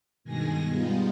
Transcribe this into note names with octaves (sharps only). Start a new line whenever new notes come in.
G2 B2 D#3 G#3 G#5 A#6
G3 G#3 B3 D#4 F4